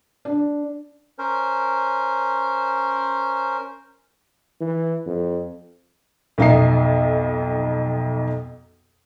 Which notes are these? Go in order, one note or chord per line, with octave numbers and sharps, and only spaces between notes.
D4
C#4 A#4 C5
E3
F2
B1 F2 D#4 E5 F5 C7